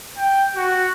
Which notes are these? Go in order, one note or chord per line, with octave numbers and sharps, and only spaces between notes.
G5
F#4